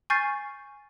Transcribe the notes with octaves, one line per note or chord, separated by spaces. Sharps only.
G#5 C#6 F6 G6 A6 C7